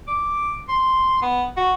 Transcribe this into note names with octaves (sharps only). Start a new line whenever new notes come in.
D6
C6
B3
F#4